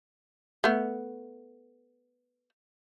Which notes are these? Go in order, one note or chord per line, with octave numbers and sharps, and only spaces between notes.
A3 B3